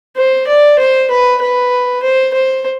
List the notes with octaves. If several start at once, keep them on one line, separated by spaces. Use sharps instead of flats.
C5
D5
C5
B4
B4
C5
C5